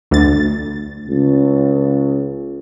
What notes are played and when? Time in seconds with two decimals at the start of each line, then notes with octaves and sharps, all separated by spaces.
0.11 D2 A6
1.10 C#2